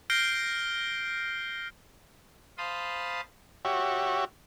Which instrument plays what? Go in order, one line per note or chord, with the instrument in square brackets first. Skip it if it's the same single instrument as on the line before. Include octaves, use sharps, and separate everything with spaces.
[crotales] F6 G6 A#6 C7 D7 G7
[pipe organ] C5 F5 A5 B5 C6 D#6
[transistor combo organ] F#4 G4 C#5 E5